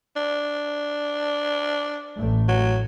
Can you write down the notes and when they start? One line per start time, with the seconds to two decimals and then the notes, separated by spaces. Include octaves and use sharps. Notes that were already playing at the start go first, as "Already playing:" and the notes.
0.16 D4
2.17 A1 A3
2.48 F#3